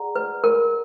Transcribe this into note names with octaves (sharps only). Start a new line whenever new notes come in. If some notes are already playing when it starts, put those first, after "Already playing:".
Already playing: G#4 D5 F#5 A#5
B4
A#4